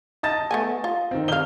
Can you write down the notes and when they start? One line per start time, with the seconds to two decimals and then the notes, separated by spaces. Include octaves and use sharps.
0.23 D#5 A5 A6
0.51 A3 B3 G#5
0.84 F4
1.11 D#3 C4
1.28 D#5 F5 F6 G7